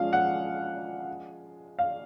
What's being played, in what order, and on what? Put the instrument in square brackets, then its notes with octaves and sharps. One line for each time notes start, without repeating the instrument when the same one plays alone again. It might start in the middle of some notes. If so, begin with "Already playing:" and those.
Already playing: [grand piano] F3 G#3 C#4 F4 G#4 [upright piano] F5
[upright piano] F#5
F5